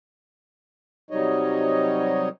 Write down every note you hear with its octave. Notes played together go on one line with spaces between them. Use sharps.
C3 F#3 G3 D#4 C#5 D#5